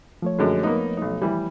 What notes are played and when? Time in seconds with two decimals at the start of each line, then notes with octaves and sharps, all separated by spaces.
0.22 F3 A3 C#5
0.39 F#2 D3 G#3
0.63 A#3 B3 D#4
0.97 B1 D#4
1.22 E3 G3